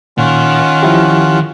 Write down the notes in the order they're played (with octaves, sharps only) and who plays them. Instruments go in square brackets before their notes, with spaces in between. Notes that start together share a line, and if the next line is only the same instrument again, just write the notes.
[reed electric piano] A#2 [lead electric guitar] D#3 [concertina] C#4 F4 F#5
[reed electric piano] F3 E4 G4